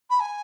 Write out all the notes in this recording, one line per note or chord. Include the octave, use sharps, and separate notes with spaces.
B5
G#5